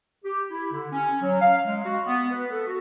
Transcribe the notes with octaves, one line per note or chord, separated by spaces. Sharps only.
G4
E4
D3
C#4
F#3
F5
G#3
F#4
B3
B4
A4
F#4